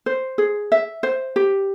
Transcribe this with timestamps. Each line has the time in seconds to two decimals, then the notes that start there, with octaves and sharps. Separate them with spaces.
0.06 C5
0.38 G#4
0.72 E5
1.03 C5
1.36 G4